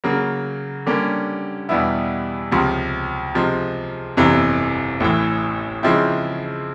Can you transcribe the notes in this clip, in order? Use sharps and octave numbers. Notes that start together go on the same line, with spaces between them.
C#3 F#3 A#3
D3 G3 A#3 C#4
E2 B2 G3 B3 E4
C#2 C3 F3
C3 F3 G#3
G1 F2 C3 E3
A1 A2 E3
C#3 F3 G#3 C4 E4